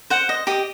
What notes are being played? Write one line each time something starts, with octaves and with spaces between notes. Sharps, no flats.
C5 F#5
D#5
G4 D#5